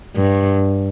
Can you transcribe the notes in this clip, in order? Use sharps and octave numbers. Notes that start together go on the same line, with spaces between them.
G2